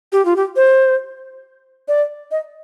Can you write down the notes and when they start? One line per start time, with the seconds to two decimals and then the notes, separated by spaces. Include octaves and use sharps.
0.12 G4
0.25 F4
0.36 G4
0.56 C5
1.88 D5
2.31 D#5